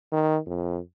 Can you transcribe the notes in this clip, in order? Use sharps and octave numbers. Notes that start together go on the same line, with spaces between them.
D#3
F2